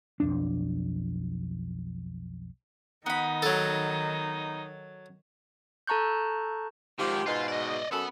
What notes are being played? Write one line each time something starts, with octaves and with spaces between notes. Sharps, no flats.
B1 F2 D4
D#3 B3 D#4 B5
F#3 A4
A4 A5 A#5 C#6 F#6 G6
G#2 D#3 F3 G4
G#2 B2 F4
D5 D#5
F#2 B3 A4 B5